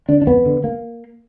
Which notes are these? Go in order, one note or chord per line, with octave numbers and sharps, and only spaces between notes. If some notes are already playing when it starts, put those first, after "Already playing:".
D3 D4
D4
F2 B3
D3
A#3